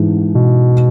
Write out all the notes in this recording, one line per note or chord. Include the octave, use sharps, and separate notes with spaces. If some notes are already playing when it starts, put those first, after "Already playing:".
Already playing: G#2 E3
B2